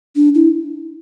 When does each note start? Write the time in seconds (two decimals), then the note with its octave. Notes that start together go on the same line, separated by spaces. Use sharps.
0.16 D4
0.35 E4